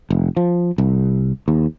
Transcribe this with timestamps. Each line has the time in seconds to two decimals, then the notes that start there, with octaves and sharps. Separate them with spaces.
0.10 F1
0.37 F3
0.78 C2
1.48 D#2